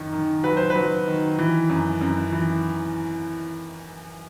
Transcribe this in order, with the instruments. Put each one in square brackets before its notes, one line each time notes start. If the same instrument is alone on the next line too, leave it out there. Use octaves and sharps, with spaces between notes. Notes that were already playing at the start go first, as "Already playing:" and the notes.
Already playing: [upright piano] F#2 D#3
D#3
F#3 B4
C5
F#3 B4
D#3
E3
F#2
F#2
E3